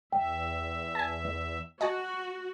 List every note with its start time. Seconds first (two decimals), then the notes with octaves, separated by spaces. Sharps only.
0.12 E2 E5 G5
0.95 G#5 A5
1.25 E3
1.81 F#4 D#5 G#5 A5